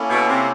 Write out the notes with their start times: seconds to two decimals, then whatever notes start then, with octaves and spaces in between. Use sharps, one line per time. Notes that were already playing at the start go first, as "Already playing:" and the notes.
Already playing: A#3 C#4 E4 A4
0.10 B2
0.29 C3